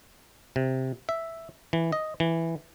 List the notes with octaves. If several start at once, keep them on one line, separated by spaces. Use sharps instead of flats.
C3
E5
E3
D#5
E3